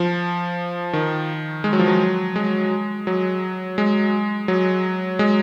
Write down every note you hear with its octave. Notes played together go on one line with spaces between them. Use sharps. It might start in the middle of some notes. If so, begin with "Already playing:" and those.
Already playing: F3
D#3
G#3
F#3
F3
F#3
G#3
F#3
G#3
F#3
G#3